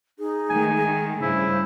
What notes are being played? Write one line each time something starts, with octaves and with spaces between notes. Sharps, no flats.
D#4 G#4
D#3 G#3 A3 G#5
G2 C#3 E4 C5